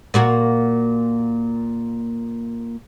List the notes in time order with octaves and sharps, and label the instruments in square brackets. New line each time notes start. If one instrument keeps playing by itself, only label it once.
[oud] A#2 A#3 F#4